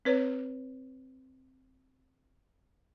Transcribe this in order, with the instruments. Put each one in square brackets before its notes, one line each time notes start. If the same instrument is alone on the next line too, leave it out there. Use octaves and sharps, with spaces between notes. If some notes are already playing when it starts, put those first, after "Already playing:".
[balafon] C4 B4 C#5